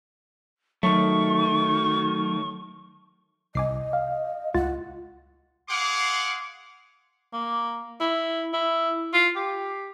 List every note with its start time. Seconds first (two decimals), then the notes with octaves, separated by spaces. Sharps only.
0.83 D#3 F#3 A3 C#6
3.55 C2 D#5 G#5 D6 C7
3.93 F5
4.54 C#2 F4 F#5 A6
5.69 G#4 F5 F#5 C6 D6
7.33 A#3
8.00 E4
8.53 E4
9.14 F4
9.36 G4